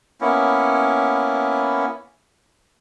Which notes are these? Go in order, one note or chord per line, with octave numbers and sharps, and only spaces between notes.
A#3 B3 C#4 E4